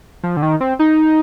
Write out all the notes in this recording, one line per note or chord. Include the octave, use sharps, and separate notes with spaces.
F3
D3
D#3
C4
D#4